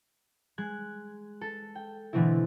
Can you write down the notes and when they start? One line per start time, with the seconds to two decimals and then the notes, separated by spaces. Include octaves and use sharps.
0.58 G#3 F#6 G#6
1.41 A4
1.75 G5
2.13 B2 D3 E3 A3 C4 E4